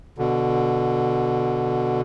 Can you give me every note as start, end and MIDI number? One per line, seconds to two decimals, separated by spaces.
0.18 2.01 47
0.18 2.01 50